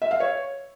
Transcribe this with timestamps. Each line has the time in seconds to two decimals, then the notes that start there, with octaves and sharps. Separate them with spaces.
0.02 E5
0.11 F5
0.20 C#5